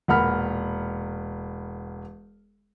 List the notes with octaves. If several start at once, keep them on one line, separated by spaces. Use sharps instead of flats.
E1 A#2 A#4 F#5 B5 F6